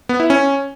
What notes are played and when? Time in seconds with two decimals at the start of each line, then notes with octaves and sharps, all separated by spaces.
0.09 B3
0.20 E4
0.30 C#4